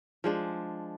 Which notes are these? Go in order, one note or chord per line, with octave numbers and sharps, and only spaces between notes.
F3 G#3 D4